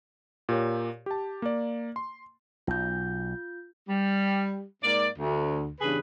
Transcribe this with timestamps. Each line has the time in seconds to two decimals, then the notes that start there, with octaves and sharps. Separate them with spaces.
0.49 A#2 G4 A#4 C#5
1.06 G4 A5
1.42 A#3 D5
1.96 C6
2.67 B1 F4 G6
3.88 G3
4.83 G#2 A#3 D5
5.19 D2
5.81 E2 G2 C#3 G#4 B4